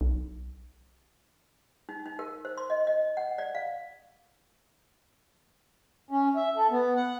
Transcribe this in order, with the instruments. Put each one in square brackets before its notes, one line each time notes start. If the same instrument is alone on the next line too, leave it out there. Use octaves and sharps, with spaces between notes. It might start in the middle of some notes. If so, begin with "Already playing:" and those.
[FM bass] B1
[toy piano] D#4
D#4
A#4
C5
C6
D#5
D#5
F#5
D5
F5
[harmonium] C#4
E5
A4
B3
F#5